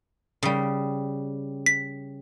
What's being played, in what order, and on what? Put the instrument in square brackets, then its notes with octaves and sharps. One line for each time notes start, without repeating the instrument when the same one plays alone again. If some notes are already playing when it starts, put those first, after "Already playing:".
[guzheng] C#3 G3
[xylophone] B6